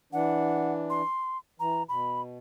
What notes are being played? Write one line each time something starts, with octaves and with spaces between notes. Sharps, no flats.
E3 D4 F#5
C6
E3 A#5
B2 B5